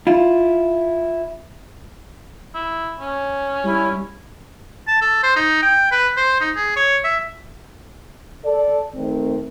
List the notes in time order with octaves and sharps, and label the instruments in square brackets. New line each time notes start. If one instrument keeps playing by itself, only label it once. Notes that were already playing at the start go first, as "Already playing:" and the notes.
[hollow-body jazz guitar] E4 F4
[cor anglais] E4
C#4
[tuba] G3 [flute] E4
[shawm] A5
A4
C5
D#4
G5
B4
C5
D#4
G#4
C#5
E5
[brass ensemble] A4 D5
D#3 A3 C4